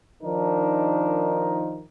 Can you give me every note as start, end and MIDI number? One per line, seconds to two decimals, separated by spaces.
0.23 1.82 51
0.23 1.82 53
0.23 1.82 62
0.23 1.82 63
0.23 1.82 70